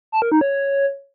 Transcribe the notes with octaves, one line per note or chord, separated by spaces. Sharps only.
A5
A#4
D#4
C#5